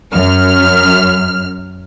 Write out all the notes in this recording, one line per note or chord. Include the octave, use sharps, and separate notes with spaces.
F#2 F6